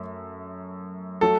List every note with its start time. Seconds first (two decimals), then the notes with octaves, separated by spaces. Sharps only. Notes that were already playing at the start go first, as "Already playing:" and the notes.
Already playing: F#2 A3
1.21 F#3 A3 A4